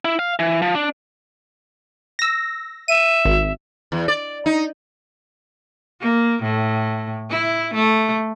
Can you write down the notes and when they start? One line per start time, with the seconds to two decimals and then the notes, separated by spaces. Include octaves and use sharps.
0.05 E4
0.19 F5
0.39 E3
0.62 F3
0.75 D4
2.19 E6 A#6
2.88 E5 D#7
3.25 G#1
3.92 E2
4.08 D5
4.46 D#4
6.01 A#3
6.42 A2
7.30 E4
7.74 A3